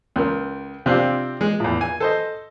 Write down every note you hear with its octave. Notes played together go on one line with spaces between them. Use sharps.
C#2 A#4
C3 C4 D4 F4
G#3
E2 A2
G#5
A4 C5 D#5